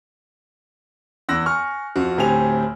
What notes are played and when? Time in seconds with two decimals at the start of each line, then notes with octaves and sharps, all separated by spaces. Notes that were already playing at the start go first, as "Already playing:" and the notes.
1.29 E2 E6 F#6 A#6
1.46 G#5 C#6 F6
1.96 F2 F#4
2.17 D2 A2 C4 G4 G#5 F7